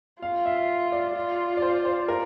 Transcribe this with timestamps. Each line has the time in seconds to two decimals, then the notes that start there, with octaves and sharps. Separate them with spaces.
0.22 F4 F5
0.46 E5
0.92 D5
1.15 F4
1.57 D5
1.62 C5
1.85 C5
2.08 A#4